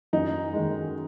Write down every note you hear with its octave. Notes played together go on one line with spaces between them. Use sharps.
F#2 D#4
D#3 G#3